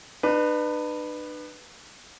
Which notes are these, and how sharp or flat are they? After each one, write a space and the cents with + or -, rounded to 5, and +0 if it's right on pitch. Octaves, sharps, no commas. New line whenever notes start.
D4 +45 B4 +0